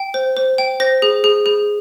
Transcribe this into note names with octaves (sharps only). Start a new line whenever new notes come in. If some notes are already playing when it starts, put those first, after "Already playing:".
Already playing: G5
C5
C5
G5
C5 A#6
G#4
G#4
G#4